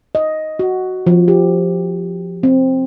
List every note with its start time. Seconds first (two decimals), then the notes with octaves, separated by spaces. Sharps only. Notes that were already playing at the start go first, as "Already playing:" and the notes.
0.15 D#5
0.59 F#4
1.07 F3
1.28 G4
2.43 C4